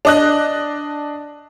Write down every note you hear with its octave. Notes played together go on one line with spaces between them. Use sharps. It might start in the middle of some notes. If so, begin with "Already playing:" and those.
D4 D#5 F#6